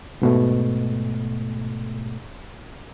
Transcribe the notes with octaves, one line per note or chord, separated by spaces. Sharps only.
G#2 B2 A3